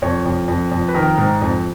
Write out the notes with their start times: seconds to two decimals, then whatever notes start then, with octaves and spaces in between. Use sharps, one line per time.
0.02 F2 C#5
0.26 F2
0.48 F2
0.72 F2
0.88 B4
0.94 D#3 A#4
1.18 G#2
1.41 F2